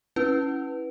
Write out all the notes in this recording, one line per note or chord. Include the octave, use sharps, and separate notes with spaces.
C#4 E4 B4